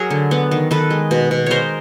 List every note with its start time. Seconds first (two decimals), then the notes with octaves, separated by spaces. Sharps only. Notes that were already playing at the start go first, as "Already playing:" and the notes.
Already playing: F#3 G#4 A#4
0.11 D3
0.31 B3
0.51 D#3
0.71 D#3 A4 B4
0.90 G#3
1.11 B2
1.31 B2
1.46 G#3 A#4 C5 C#5